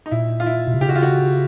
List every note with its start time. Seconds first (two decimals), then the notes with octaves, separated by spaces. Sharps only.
0.06 D#4
0.11 A#2 E4
0.40 F4
0.46 E4
0.67 B2
0.74 C3
0.81 C#3 G4
0.89 F#4
0.96 F4
1.03 F#4